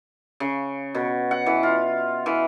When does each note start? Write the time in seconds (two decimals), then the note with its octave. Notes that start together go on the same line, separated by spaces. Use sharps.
0.40 C#3
0.95 B2
1.31 F#5
1.46 E3
1.63 F4
2.26 E3